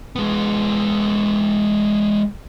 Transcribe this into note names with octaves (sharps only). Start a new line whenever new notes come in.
G#3 B3